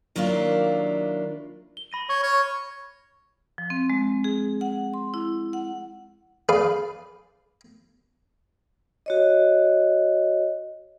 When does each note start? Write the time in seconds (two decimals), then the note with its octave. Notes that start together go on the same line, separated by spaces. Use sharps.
0.16 D#3 F#3 A#3 D4 E4 F4
1.77 G7
1.92 B5 A#6 D#7
2.09 C#5 C#6
2.23 C#5 F6
3.58 F3
3.70 C4
3.90 G#3
4.24 G#4
4.61 F#5
4.94 C6
5.14 E4
5.53 F#5
6.49 G#4 B4 D5 F5
9.06 F#4 C#5 D#5